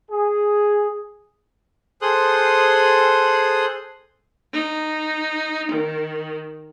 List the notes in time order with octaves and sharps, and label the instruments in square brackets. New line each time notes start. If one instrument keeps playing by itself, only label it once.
[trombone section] G#4
[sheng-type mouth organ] G#4 A4 C5 C6 D#6 F#6
[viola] D#4
D#3